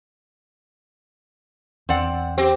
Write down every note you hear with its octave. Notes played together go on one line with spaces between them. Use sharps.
E2 C4 D5 F#5
C4 G4